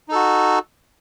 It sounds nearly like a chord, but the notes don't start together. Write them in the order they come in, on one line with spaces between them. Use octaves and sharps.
D#4 A4 F#4